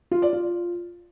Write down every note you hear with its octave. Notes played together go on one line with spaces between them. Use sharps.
F4
D5
F4